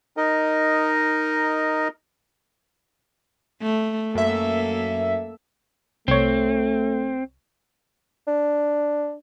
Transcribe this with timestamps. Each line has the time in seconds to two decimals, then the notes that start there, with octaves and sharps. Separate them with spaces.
0.17 D#4 A#4 D#5
3.62 A3
4.15 F#2 A#3 A4 E5
6.08 C2 A3 C4 C#5
8.28 D4